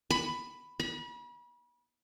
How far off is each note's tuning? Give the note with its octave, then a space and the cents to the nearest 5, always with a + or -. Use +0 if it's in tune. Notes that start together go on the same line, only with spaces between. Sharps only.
B5 +10
B5 -35